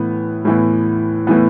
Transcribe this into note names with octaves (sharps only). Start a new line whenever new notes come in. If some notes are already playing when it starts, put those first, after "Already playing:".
Already playing: A2 E3 B3
A2 E3 B3
A2 E3 B3